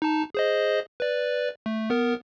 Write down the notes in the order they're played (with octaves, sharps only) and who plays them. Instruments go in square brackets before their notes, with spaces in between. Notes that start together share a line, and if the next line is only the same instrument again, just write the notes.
[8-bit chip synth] D#4 A5
G#4 C5 D#5
B4 D5
A3
B3 A#4